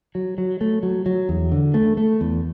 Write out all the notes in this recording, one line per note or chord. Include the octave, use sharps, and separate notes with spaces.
F#3
F#3
A3
F#3
F#3
E2
D3
A3
A3
E2